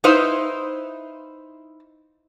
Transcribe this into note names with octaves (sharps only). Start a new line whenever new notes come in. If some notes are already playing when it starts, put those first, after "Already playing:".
D#4 E4 B4 C5 F5